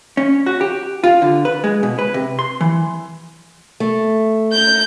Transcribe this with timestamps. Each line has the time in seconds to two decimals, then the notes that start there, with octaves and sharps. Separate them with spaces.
0.17 C#4
0.46 F#4
0.61 G4
1.04 F4
1.22 D3
1.45 B4
1.64 G#3
1.83 B2
1.99 B4
2.14 C3
2.39 C6
2.61 E3
3.80 A3
4.52 G6